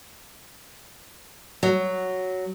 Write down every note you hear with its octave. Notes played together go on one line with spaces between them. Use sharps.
F#3